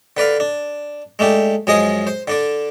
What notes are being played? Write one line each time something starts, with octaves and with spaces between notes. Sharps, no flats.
D3 B4 D5 F5
D4
G#3 A3 D4 G4
F#2 F3 G#3 G#4 D#5 D#6
C5
D3 D4 D5